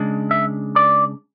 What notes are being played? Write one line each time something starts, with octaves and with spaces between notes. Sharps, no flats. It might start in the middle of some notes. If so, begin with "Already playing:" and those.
Already playing: C#3 G#3 D4
E5
D5